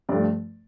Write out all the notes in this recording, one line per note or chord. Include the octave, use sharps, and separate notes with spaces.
G2 F3 A3 D5